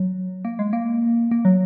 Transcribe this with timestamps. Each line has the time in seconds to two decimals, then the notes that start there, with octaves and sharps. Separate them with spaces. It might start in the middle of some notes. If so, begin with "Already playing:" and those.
Already playing: F#3
0.45 A#3
0.59 G#3
0.73 A#3
1.31 A#3
1.45 F#3